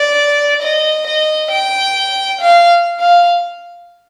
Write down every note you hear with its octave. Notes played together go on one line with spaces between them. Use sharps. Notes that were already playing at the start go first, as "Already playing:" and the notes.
Already playing: D5
D#5
D#5
G5
F5
F5